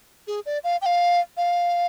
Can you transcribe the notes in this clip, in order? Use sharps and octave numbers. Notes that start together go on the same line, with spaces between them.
G#4
D5
F5
G5
F5
F5